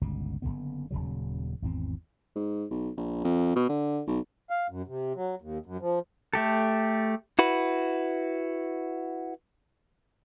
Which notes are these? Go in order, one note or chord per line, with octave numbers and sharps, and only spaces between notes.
G1 C#2 B2
F#1 G2 D3 B3
D#1 C2 C#3 F#3
G#1 E2 C4
G#2
B1
A#1
F2
B2
D3
B1
F5
F#2
C3
F#3
D#2
F#2
F3
A3 G4 A4
E4 F#4 B4